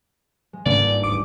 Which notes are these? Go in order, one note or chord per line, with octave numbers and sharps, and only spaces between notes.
G#3
G1 G#2 C#3 A3 A#3 D5
D3 A#3
D1 D6